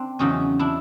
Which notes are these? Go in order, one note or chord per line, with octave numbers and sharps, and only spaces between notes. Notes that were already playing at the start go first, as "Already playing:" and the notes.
Already playing: C4 D4
E2 C#3 F#3 C#4 D#4
D4 E4